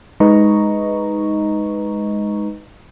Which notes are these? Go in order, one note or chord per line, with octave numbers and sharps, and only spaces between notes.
G#3 D#4 B4 D#5 A#5 C#6